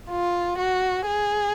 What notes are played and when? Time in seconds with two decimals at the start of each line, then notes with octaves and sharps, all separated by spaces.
0.09 F4
0.57 F#4
1.05 G#4